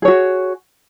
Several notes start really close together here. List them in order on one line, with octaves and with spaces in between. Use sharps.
G#4 C#5 F#4